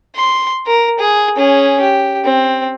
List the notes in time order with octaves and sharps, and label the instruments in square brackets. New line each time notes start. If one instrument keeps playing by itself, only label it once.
[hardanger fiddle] C6
A#4
G#4
C#4 G#4
G4
C4